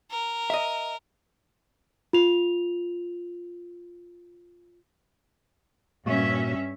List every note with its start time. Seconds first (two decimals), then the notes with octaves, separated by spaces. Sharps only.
0.11 A#4
0.50 D#5 E5
2.13 F4 F7
6.06 G2 A#2 A#3 C#4 F#4 E5